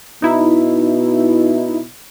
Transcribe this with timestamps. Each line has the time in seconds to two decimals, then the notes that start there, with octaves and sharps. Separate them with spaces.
0.22 B2 D#4 E4